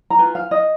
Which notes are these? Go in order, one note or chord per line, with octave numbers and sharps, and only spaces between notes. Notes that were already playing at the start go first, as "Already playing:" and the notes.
A#5
F4 B4 G#5
F5
D#5